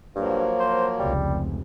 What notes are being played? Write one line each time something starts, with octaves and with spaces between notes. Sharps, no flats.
G2 F3 F#3 A#3
C5
F1 C#2 G3